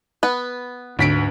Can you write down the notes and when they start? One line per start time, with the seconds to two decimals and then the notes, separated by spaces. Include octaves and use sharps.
0.23 B3 B4
0.99 D2 G#2 D4 B6 D7